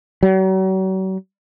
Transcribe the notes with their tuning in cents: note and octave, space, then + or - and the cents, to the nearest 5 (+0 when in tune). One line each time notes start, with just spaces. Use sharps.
F#3 +40